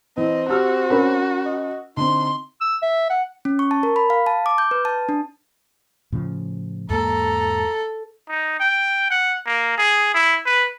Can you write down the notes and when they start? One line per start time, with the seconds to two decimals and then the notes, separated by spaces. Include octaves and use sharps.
0.17 E3 C4 D#5
0.49 F#4 G4 E6 F6
0.90 C#4 A#4 B5
1.45 D#5
1.97 D3 C4 D#4 C6
2.61 E6
2.82 E5
3.10 F#5
3.45 C#4
3.59 C#6
3.71 A5
3.83 A#4
3.96 B5
4.10 F5
4.26 A5
4.46 D6
4.58 G6
4.71 B4
4.85 A5
5.09 D4
6.12 A2 C#3 F3
6.90 E2 G#2 A#3 A4 A#5
8.29 D#4
8.60 G5
9.11 F#5
9.46 A#3
9.78 G#4
10.14 E4
10.46 B4